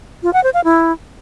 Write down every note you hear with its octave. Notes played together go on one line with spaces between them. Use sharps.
F4
F#5
C5
F5
E4